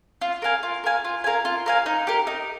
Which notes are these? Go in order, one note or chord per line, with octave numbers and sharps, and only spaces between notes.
F4
A#4 F5 G#5
F4
A#4 F5 G#5
F4
A#4 F5 G#5
F4
A#4 F5 G#5
D#4
G4 A#4
D#4